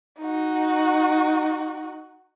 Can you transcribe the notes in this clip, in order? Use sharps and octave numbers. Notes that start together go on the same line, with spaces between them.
D#4 F#4